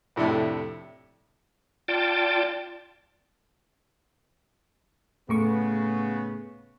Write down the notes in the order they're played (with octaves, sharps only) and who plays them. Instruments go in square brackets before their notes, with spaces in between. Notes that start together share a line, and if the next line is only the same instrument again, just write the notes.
[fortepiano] F2 A2 C3 D4 E4
[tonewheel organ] F4 D5 G5 A5
[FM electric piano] A2 A3 C#6 [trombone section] C#3 B3